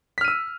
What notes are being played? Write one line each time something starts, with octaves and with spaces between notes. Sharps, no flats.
E6 F6 B6 D#7